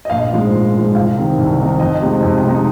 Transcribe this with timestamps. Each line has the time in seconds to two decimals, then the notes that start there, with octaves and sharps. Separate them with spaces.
0.05 D#5
0.10 A#1 F5
0.31 G#2 F3 G#3
0.52 A#1
0.74 G#2 F3 G#3
0.95 C2 F5
1.17 C3 D#3 C4 D#4
1.37 C2
1.60 C3 D#3 C4 D#4
1.80 F2 D#5
2.02 C3 G#3 D#4
2.22 F2
2.43 C3 G#3 D#4